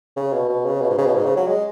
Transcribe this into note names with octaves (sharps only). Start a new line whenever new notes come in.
C#3
B2
B2
C#3
B2
G#2
C#3
B2
G#2
C#3
F#3
G#3